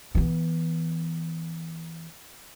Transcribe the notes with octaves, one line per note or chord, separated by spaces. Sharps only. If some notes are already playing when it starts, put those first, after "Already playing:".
E3 B3